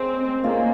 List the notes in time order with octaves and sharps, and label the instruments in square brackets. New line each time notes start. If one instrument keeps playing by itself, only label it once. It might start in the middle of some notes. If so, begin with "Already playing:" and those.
Already playing: [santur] G#3 C#4 G#4 C#5 [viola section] C4
[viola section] A#3 [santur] C#4 F4 G#4 D#5